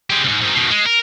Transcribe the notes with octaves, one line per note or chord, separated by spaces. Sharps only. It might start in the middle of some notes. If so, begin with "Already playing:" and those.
G#3 G4
C#2 G#2
G#2 D#3
B2 D#3
G#3
A#4